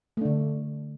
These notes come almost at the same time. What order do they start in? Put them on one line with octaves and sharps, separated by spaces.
A3 D4 D3